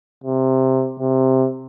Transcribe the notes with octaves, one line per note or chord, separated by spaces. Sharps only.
C3
C3